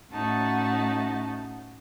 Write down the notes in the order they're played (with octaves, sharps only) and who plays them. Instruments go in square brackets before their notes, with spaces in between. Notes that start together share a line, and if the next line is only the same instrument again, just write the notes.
[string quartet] A2 A3 C#4 D#4 F#4 A5